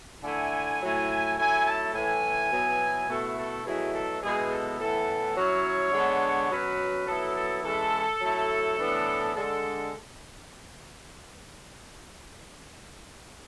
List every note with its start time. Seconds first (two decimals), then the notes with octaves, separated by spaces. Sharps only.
0.24 D3 A3 E4 G#5
0.82 A2 F#3 A3 E4
1.38 F#3 A3 E4 G#5
1.66 A5
1.95 A2 E3 A3 G#5
2.52 B2 F#3 B3 E4
3.09 B2 A3 E4 A4
3.37 A4
3.66 B2 F#3 A3 E4 G#4
3.94 A4
4.22 B2 G#3 B3 E4 G#4
4.50 A4
4.80 A2 E3 B3 A4
5.36 F#3 C#4 E4 C#5
5.93 D3 G#3 B3 D4
6.50 B2 F#3 C#4 B4
7.07 F#3 B3 E4 A4
7.36 A4
7.64 E3 G#3 C#4 E4 A4
8.22 F#3 A3 E4
8.78 A2 E3 B3 D4
9.34 D3 G#3 D4 A4